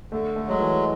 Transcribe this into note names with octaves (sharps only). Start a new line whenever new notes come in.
D3 A3
A3
F#3 G#3
E3